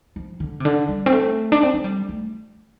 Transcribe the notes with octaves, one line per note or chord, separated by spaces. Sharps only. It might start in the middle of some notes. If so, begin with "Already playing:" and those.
F3
D3
C3
D3
G3
C4
A3
D4
C4
A3
G3
A3